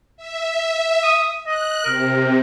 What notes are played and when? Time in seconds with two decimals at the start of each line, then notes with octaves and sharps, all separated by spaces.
0.17 E5
1.03 D#6
1.46 D#5 F#6
1.85 C3 A#4